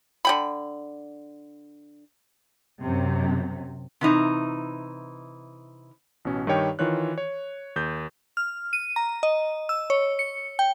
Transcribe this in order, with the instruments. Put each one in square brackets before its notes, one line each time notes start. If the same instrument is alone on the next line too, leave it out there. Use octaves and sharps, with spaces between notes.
[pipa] D3 G5 B5
[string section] F#2 C3
[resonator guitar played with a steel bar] C3 E3 D#4
[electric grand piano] A1 B2 C#4
G2 D#3 D#4 G4 C#5 G5
D#3 E3 F4 C#5 F#6
C#5
D#2 G6
[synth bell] F6
D#7
A#5
D#5
E6
C#5
C#7
G5